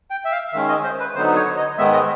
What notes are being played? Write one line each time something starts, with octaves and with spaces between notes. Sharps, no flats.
G5
E5
F5
D#3 G#3 C#4 E5
D#5
C5
B4
D3 F#3 B3 D#4 C5
C#5
D#5
G#2 D#3 G#3 B3 E5
D#5